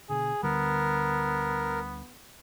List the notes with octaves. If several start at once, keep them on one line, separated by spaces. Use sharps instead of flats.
B2 D3 G#4
D2 D3 G3 B3 A#4